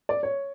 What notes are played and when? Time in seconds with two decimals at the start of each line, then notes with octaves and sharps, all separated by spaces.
0.09 D5
0.23 C#5